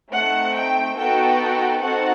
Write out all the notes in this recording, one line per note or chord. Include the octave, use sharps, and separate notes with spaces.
A3 C4 D#4 F#5
G5
B3 D#4 F#4 A4 G5
C4 D#4 F#4 A4 F#5